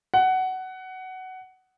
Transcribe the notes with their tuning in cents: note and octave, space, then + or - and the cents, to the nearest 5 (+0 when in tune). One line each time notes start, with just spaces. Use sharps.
F#5 +15